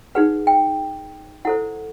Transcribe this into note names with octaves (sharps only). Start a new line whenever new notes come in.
D#4 G#4 B4 F#5
G5
E4 A4 C5 F#5